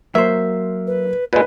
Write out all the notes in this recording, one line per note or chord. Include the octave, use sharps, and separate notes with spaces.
F#3 A#3 C5 E5
B4
A#2 G#3 A#4 B4